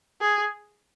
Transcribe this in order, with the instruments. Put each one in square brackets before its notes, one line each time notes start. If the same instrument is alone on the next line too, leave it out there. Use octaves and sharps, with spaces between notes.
[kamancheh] G#4